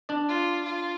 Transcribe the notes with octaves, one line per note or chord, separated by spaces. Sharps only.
D4 D5
F4
F4